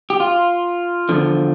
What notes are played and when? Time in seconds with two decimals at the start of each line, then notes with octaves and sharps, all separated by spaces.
0.10 G4
0.20 F4
1.09 E2 D3 F3